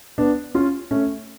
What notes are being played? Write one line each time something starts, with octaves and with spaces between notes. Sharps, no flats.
B3 D4
C#4 F4
A3 C#4